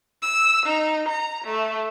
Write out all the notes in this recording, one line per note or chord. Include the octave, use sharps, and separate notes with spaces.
E6
D#4
A#5
A3